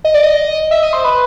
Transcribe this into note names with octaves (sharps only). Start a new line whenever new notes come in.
D#5
D5
D#5
E5
D#5
C5
B4